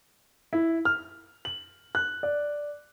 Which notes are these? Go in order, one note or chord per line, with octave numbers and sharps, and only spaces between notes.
E4
F6
F#7
F#6
D5